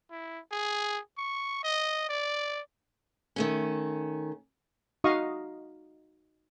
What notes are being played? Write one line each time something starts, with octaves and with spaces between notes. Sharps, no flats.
E4
G#4
C#6
D#5
D5
D#3 A3 C#4
D#4 F#4 D#5 F5 C#6 D#6